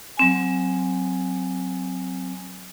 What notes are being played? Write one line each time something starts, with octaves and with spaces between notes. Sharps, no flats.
F#3 C4 G#5